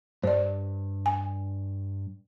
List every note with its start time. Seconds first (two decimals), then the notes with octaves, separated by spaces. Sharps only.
0.23 G2 C5 D5
1.06 G#5